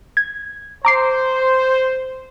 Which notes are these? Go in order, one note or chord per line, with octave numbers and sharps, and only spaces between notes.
G#6
C5 A#5 D6 C7